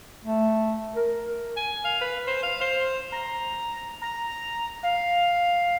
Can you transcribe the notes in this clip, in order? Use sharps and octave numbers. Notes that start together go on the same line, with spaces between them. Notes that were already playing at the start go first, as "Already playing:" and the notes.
A3
A#4
G#5
F5
B4
C5
F5
C5
A#5
A#5
F5